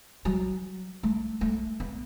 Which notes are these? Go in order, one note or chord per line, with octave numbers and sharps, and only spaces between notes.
F#3
A3
A3
B3